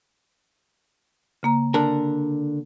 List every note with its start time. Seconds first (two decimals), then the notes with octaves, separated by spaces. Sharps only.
1.43 C#3 A#3 A#5
1.74 D3 D4 A#4 A5